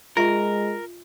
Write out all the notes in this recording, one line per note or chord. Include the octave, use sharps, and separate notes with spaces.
G#3 F4 A#4 E5 C#6